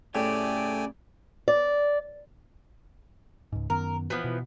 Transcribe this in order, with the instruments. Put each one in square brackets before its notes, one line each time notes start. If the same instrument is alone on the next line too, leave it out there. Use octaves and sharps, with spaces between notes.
[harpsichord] A2 [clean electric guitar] C#3 G4 [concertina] A3 G5 G#5 [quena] D5
[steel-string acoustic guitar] D5
[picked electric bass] C#2 G#2
[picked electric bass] F#2 D#3 B3 [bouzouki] A#4
[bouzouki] E3 F3 B3
[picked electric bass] B2